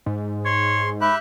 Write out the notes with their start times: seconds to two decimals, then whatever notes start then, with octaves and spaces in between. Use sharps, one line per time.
0.06 G#2
0.45 C#5 C6
1.01 G4 E5 B5 F#6